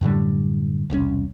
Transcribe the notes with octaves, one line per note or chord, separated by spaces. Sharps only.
F#2 A2 D3 G3
E1 C2 B2 C#4